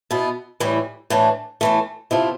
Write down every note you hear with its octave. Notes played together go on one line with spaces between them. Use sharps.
B2 B3 E4
A2 E3 G3
A2 E3 A3 D4
A2 E3 A3
C3 F3 A3 C4 E4